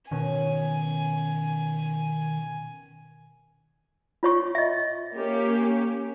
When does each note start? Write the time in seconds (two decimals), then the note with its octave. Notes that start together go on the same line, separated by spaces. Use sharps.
0.11 B2 D#3 C#4 G#5
4.23 F4 C#5 C#6
4.55 D#5 E5
5.15 A#3 C#4 G4